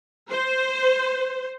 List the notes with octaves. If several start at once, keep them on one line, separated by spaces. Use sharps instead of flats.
C5